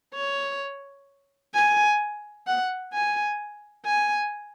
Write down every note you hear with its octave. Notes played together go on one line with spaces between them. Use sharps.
C#5
G#5
F#5
G#5
G#5